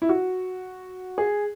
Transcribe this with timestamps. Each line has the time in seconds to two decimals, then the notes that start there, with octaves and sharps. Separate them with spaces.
0.02 E4
0.09 F#4
1.18 G#4